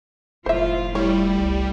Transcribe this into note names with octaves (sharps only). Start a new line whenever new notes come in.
F1 A2 F3 F4 C5 E5
G3 A3 E4 C#5
C2